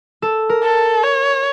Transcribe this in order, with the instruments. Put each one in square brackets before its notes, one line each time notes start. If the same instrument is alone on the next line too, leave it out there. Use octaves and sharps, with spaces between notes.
[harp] A4
A#4
[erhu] A4
C#5